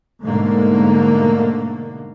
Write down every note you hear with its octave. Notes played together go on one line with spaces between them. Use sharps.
G#2 B2 D3 A3 A#3